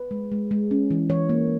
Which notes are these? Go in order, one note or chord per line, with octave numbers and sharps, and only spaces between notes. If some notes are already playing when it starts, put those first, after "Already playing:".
Already playing: B4
G#3
G#3
G#3
C#4
E3
E3 C#5
A#3